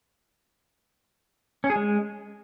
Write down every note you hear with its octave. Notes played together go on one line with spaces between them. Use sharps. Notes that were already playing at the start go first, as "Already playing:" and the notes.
C#4
G#4
G#3